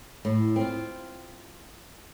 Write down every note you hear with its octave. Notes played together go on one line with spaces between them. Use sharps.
A2
C4 F4